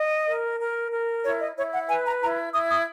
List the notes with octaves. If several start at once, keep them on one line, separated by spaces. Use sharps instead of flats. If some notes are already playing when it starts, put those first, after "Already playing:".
Already playing: D#5
A#4
A#4
A#4
E4 C#5
D#5
E4 C#5
F#5
B4 G#5
A#5
E4 A#5
E4 D#6
D#6